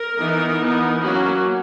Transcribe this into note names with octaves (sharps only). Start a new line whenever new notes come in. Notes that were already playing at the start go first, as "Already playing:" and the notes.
Already playing: A#4
E3 B3 D#4
E3 B3 D#4
F#3 A#3 C#4 F#4